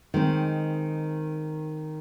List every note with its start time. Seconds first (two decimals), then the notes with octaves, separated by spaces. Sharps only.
0.14 D#3 G#3 C4